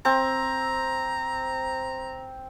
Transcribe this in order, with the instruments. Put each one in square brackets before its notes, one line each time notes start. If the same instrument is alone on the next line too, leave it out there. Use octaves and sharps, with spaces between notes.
[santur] C4 [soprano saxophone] A#5